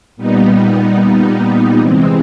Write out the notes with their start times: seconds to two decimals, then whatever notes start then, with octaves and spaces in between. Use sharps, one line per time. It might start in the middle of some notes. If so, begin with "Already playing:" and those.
0.16 A#2 G3 B3 D#4
1.77 C3 E3 G#3 C4